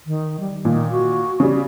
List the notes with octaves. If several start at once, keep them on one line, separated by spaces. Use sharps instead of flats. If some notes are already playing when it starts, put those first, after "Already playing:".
D#3
G3
A#2 D#3
F#4
C#3 G3